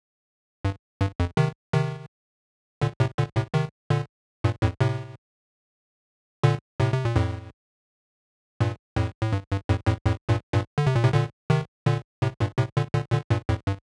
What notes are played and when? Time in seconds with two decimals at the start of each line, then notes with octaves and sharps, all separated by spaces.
0.65 G2
1.01 G2
1.20 F2
1.37 C3 D#3
1.73 C3 D#3
2.82 A#2 D3
3.00 A2 C3
3.18 A#2 D3
3.36 A2 C3
3.54 C3 D#3
3.90 A#2 D3
4.44 G2 A#2
4.62 F2 A2
4.81 A2 C3
6.44 A#2 D3
6.80 A2 C3
6.94 C3
7.05 A#2
7.16 F2 A2
8.61 G2 A#2
8.96 F2 A2
9.22 A2
9.32 G2
9.51 G2
9.69 F2 A2
9.87 F2 A2
10.05 F2 A2
10.29 G2 A#2
10.53 G2 A#2
10.78 D3
10.87 C3
10.96 A#2
11.04 A2 C3
11.13 A#2 D3
11.50 C3 D#3
11.86 A#2 D3
12.22 A2 C3
12.40 G2 A#2
12.58 A2 C3
12.77 A#2 D3
12.94 A#2 D3
13.12 A#2 D3
13.31 G2 A#2
13.49 F2 A2
13.67 G2